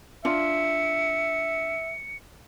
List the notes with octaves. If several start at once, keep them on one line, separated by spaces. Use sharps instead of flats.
D4 F4 E5 C#7